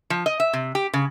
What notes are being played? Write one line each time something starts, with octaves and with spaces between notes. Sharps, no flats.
F3
D#5
E5
C3
G4
C#3